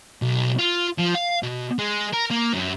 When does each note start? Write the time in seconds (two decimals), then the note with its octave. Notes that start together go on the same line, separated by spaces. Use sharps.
0.22 B1
0.59 F4
0.98 F3
1.14 F5
1.43 B2
1.79 G#3
2.13 A#4
2.30 A#3
2.53 F#2